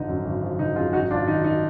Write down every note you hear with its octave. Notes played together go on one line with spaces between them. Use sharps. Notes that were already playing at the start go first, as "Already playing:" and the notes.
Already playing: G#1 D3 F3 D#4
F#2
G#1
F3
D3 D#4
F#2 F4 G#4
G#1 D#4 F#4
G#1 D4 F4
D#3 D#4
D#4